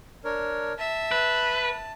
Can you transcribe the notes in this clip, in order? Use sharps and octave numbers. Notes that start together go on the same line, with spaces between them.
D4 A#4 C#5
E5 A5
B4